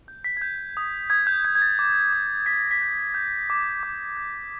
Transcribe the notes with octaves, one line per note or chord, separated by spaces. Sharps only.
G6
B6
G#6
G6
D#6
D#6 G#6
G6
G6 G#6
G#6
A6
D6
D6
G6 B6
A#6
B6
G6
G6
D6
D6
G6